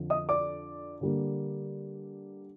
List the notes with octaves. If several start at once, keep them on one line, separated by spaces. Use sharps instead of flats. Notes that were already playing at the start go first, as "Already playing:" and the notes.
Already playing: F2 D3 F3
D#5 D#6
D5 D6
D3 G3 A#3